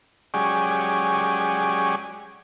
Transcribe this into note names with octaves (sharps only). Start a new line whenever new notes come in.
F#3 G#3 C#4 G4 G#4 D5